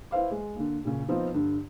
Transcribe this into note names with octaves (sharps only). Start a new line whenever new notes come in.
E4 B4 C5 F5 D6
G#3
D3 A#3
A#2 C#3
F3 B3 C4 D#4 F4
G2 D3